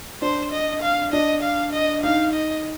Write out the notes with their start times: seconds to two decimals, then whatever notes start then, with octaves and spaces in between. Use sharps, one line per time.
0.22 D4 C5
0.52 D#5
0.82 F5
1.13 D4 D#5
1.43 F5
1.73 D#5
2.03 D#4 F5
2.33 D#5